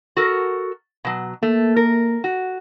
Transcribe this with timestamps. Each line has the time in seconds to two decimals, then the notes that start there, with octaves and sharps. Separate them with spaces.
0.17 F#4 A4 A#4
1.05 B2 F#3
1.43 A3 A#3
1.76 A#4
2.24 F#4